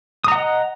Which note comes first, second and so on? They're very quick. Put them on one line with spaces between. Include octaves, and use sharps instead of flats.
D#6 A#5 F#5 D#5